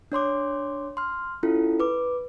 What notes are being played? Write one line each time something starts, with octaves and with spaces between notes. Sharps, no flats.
D4 C#5 C6 D6
C6 F6
C#4 E4 F4 A4
B4 D6